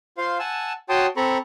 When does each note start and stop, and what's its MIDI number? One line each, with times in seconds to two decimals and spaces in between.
0.18 0.38 65
0.18 0.38 72
0.18 0.38 77
0.18 0.38 84
0.39 0.73 78
0.39 0.73 80
0.39 0.73 81
0.39 0.73 88
0.89 1.06 66
0.89 1.06 73
0.89 1.06 79
0.89 1.06 81
0.89 1.06 84
0.89 1.06 87
1.17 1.38 60
1.17 1.38 69
1.17 1.38 82
1.17 1.38 83
1.17 1.38 85